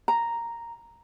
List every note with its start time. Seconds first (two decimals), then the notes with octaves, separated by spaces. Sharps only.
0.08 A#5